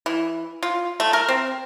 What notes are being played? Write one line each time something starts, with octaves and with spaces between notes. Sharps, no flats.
E3
F4
A3
A#4
C4